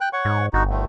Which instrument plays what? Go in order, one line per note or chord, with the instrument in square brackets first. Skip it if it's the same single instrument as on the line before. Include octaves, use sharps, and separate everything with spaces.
[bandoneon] G5 F#6
C#5 F#5 C#6
[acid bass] G#2
[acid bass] G1 [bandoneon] D#4 F#4
[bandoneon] D3 D#3 A3